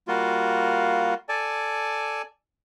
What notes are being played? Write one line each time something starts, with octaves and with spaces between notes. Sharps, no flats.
G3 A#3 F4 F#4
A4 D5 G#5 A5